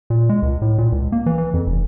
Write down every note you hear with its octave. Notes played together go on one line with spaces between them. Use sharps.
A#2
G#3
C#2
A2
A#2
C#2
A#3
E3
E3
F2
F1